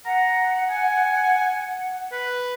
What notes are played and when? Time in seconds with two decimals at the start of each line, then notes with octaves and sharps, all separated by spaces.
0.05 F#5 A#5
0.69 G#5
2.12 B4